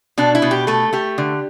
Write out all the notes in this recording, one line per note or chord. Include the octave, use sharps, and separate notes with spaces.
B2 D4
E4
B2
G4
A3 A4
A3 G4
D3